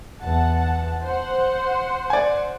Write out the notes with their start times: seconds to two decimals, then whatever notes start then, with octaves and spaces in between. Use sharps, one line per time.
0.20 E2 F#5 A5
1.04 C5 F#5
2.10 D5 G#5